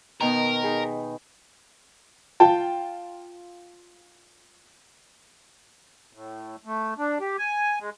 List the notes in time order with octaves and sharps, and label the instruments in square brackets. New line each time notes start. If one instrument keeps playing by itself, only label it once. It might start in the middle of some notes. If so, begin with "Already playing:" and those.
[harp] B2 D#3 [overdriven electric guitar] A#4
[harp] D#4 G#4 B4
[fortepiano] F4 G5 A5
[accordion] A2
A3
D4
G4
G#5
G#3